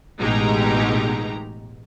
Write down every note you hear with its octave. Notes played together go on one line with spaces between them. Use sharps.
A1 B2 G#3 D#4 G4 A#5